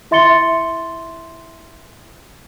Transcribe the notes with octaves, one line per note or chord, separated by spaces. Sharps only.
E4 E5 C6 A6 C#7 G7